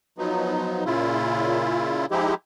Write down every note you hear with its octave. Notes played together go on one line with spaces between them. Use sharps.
F3 F#3 B3 D#4
A#2 C#3 E4 F4
F3 G#3 D#4 E4 G4